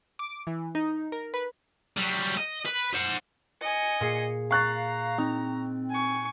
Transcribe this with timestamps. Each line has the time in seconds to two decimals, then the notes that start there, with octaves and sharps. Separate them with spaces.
0.19 D6
0.47 E3
0.75 D#4
1.12 A#4
1.34 B4
1.97 F#3 G3
2.37 D#5
2.66 B4
2.94 C5 F#5
3.61 D#5 G#5 C#7
4.00 A#2 G#4 C7
4.51 F5 A#5 C#6 F#6 A6
5.18 C4 D#4
5.89 G#5 C#6